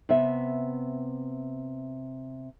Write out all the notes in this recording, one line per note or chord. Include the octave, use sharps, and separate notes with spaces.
C3 B3 E5